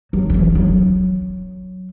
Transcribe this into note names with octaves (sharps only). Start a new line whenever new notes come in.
F#3
D3
E3
F#3